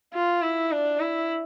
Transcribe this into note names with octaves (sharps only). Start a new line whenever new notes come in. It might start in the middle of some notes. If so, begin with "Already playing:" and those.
F4
E4
D4
E4